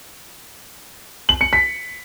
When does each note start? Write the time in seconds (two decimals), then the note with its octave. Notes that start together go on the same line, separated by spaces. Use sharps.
1.29 F#7
1.41 C#7
1.53 B6